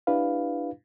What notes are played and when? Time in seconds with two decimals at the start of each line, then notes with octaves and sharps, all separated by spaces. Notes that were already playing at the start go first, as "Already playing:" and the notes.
0.07 D4 E4 G4 B4 F5